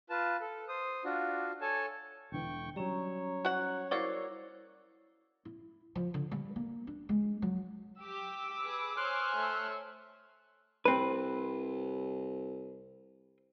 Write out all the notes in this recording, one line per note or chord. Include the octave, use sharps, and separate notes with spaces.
F4 B4 A5
A4
C5 D#6
D4 F4 F#4
A4 C#5 G#5 A5
E1 D3 E3 G5 C#6
F#3 G3 C#4 C#5 A#5
F#4 F#5
A#3 E4 F#4 C5 D5
E4
F3
D3
G3
A#3
D4
G#3
F#3
G4 D6 E6
G#4 B4
C5 C#5 G#5 C6 F6 F#6
A3 E6
C2 C4 B4